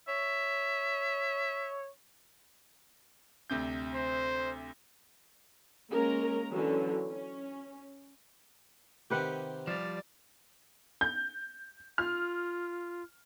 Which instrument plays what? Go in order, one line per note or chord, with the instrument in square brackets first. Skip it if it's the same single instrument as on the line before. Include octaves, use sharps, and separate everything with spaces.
[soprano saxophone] C#5 [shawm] E5
[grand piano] D2 C3 G6
[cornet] C5
[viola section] G#3 A#3 C#4 A#4 A#5
D3 E3 F#3 C#4
C#4
[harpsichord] C3 D#3 C4 [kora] G4 B4 F#5
[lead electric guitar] F3 G3 [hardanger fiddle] D5
[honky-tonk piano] G6
[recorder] F4 [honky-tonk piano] F6